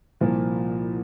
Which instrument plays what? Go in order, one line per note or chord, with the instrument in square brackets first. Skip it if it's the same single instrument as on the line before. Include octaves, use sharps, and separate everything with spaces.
[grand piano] C2 A#2 F3 A#3